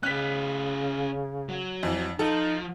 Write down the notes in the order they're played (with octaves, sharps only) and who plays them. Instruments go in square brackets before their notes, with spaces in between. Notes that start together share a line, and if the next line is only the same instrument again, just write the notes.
[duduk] C#3 [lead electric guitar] C#4 B4 [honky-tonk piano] F#6 B6
[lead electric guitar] F#3
[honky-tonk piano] F2 E3
[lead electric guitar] F3 [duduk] D#4 [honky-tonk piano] A4